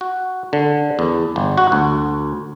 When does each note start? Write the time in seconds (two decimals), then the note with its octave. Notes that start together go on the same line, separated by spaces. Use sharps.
0.01 F#4
0.53 D3
0.99 E2
1.36 G1
1.57 F#4
1.72 D2